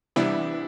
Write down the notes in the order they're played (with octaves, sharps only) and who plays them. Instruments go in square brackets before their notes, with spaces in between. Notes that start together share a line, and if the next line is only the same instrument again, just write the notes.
[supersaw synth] C3 E3 G3 B3 [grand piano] D4 E4